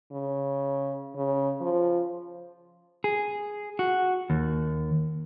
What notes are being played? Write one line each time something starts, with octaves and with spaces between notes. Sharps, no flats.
C#3
C#3
F3
G#4
F#4
D#2